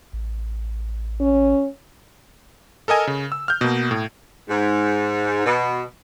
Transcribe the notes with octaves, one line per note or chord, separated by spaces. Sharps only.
A1
C#4
A4 A#4 D#5 G#5
C#3
E6
F6 G6
B2 A#3
A2
G#2
B2